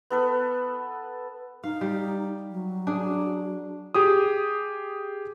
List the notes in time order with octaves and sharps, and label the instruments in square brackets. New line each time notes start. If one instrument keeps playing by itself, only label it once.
[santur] B3 A4 B4
[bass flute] D#4 [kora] F5
[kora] G3
[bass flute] F#3
[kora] D4 G#4
[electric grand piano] G4 G#4 D#6